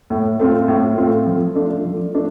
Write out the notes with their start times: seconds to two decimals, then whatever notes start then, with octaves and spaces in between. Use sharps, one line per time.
0.10 A2
0.39 A3 C4 F4
0.68 A2
0.98 A3 C4 F4
1.27 F3
1.55 A3 D4 F4
1.85 F3
2.14 A3 D4